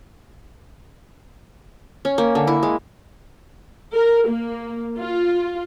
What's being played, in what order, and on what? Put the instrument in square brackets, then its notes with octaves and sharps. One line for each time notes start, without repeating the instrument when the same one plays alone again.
[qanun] C#4
A#3
D3
E4
G#3
[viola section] A#4
A#3
F4